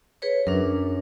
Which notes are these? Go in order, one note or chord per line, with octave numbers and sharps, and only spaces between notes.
G#4 B4 C#5
F#2 D4 A#4